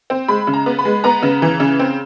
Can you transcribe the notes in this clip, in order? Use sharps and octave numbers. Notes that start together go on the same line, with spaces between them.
C4
G#3 B5
C#3
A#5
B3
B5
G#3
B3 A#5
C#3
E3
C#3
C4